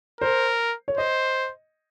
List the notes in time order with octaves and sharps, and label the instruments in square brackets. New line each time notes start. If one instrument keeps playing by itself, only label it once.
[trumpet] A#4 [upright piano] C5
[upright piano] C#5
[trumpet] C5 [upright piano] D#5